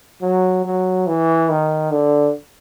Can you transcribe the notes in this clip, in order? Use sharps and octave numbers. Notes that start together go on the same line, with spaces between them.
F#3
F#3
E3
D#3
D3